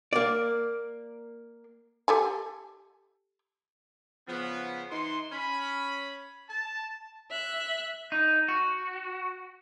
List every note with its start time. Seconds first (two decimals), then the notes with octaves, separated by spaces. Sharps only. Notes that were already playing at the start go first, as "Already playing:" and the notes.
0.13 A#3 D5
2.08 G4 A4 G#5
4.27 C#3 F3 B3
4.90 E3 D#4 C6
5.32 C#4 B5
6.49 A5
7.31 E5 F#6
8.12 D#4
8.48 F#4